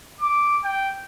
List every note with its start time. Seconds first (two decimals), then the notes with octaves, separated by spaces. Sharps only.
0.21 D6
0.64 G5